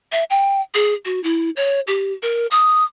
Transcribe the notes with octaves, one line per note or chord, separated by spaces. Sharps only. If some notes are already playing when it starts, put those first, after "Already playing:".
E5
G5
G#4
F#4
E4
C#5
G4
A#4
D#6